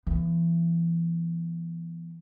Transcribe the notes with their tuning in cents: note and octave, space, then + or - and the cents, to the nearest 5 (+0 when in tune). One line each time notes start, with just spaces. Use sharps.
E3 +35 B3 -25